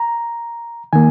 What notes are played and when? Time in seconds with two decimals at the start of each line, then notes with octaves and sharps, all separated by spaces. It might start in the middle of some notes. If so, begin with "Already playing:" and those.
Already playing: A#5
0.93 D#3 A#3 G#5